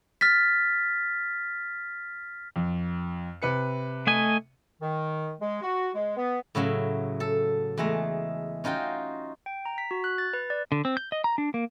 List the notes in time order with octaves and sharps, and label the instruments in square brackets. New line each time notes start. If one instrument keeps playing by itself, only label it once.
[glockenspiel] F6 A6 B6
[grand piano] F2
C3 B4 C#7
[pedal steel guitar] A3 D#5 G#5
[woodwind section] D#3
G#3
F#4
G#3
B3
[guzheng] A2 C#3 F#3 E5
A4
E2 G#3 A3 A#5
C#4 D#4 F4 F#4 G5
[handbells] G5
A#5
B6
F#4
F#6
A6
B4
D5
[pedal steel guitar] D3
C4
G6
D#5
A#5
D4
A#3